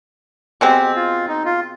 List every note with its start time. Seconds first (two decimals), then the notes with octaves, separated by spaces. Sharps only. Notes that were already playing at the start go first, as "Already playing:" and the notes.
0.61 B2 G#3 C4 G4
0.95 F4
1.28 D#4
1.45 F4